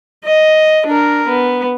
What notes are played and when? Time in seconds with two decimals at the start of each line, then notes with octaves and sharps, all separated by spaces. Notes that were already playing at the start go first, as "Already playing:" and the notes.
0.25 D#5
0.87 D4 A#4
1.28 B3